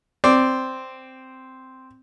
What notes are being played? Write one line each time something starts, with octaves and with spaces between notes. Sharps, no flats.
C4 D5